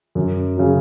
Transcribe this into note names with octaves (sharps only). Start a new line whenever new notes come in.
F#2
C#3 F#3